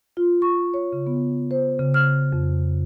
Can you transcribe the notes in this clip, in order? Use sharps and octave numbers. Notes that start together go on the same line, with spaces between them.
F4
C#6
C#5
C#3
B3
C5
C#3
F6
F2